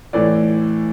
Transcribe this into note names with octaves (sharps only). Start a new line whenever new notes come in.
A2 E3 D5